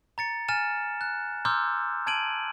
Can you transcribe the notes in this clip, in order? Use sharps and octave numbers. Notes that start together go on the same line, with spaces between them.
A#5 A6 C#7
G#5 F6 A6 E7
F#6
A#5 C6 D6 E6 F6 G6
A5 G#6 D7 D#7 F#7